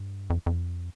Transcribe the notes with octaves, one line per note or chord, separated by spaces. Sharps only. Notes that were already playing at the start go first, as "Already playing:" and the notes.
Already playing: G2
F2
F2